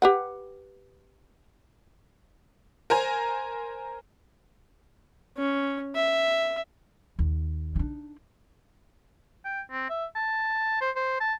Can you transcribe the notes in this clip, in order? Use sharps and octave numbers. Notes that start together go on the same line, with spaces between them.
G4 B4 F#5
A#4 C5 G#5 A#5
C#4
E5
D#2
D4 D#4
G5
C4
E5
A5
C5
C5
A5